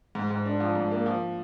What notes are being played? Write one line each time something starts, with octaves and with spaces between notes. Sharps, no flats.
G#2
G#2
D4
F3
G#2
A#3
F3